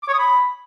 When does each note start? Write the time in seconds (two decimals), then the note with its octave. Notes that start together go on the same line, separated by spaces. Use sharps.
0.03 D6
0.08 C#5
0.13 D#6
0.18 B5